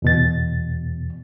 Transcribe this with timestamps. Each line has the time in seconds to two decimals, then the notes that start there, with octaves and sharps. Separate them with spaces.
0.02 E2 B2 A6